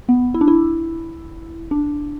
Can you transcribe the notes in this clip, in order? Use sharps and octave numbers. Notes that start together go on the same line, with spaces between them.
B3
E4
D4
E4
D4